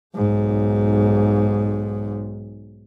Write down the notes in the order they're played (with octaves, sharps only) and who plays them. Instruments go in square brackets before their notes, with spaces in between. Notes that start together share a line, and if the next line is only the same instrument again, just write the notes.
[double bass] B1 G#2